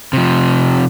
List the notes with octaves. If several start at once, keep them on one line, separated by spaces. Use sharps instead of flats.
C3 F3